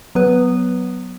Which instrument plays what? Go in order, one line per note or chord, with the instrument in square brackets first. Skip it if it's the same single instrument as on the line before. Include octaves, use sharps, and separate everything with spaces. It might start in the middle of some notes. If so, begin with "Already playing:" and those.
[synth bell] F#3 B3 B4